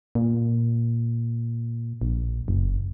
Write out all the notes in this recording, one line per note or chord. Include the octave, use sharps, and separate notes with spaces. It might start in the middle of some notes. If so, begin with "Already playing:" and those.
A#2
A#1
F#1